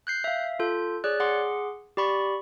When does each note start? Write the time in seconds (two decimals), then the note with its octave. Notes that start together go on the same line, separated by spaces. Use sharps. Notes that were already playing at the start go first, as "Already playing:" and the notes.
0.07 F#6 G6 C7
0.24 E5 F5
0.59 F4 A4 G6
1.04 G#4 C#5 D5 F#6
1.20 G#4 F#5 C6 D6
1.97 G4 D5 B5 C#6